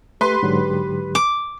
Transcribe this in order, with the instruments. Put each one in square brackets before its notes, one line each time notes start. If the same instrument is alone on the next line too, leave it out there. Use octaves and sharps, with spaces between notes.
[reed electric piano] A3 [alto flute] G4 [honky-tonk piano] B4 C6
[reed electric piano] G#2 D3 F#3
[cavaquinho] D6